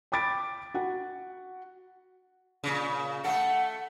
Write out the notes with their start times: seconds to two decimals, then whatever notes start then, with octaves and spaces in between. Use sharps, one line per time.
0.12 G5 B5 D6 A6 B6 D7
0.74 F#4 F#5
2.64 A#2 C#3
3.24 A3 A4 F#5